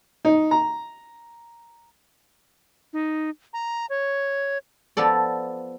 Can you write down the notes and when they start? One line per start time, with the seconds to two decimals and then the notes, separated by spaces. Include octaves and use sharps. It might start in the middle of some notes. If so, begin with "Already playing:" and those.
0.25 D#4
0.51 A#5
2.93 D#4
3.53 A#5
3.90 C#5
4.97 F3 B3 A4 D5